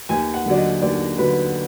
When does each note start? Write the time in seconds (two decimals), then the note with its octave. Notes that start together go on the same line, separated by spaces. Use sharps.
0.09 D#2 G#5
0.34 F#5
0.46 D3 F#3 D5
0.57 D#5
0.81 D#2 D5
1.18 D3 F#3 B4